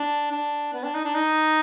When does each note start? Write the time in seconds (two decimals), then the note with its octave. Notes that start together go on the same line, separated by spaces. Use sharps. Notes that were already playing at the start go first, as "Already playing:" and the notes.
Already playing: D4
0.31 D4
0.73 B3
0.84 D4
0.94 D#4
1.04 D4
1.14 D#4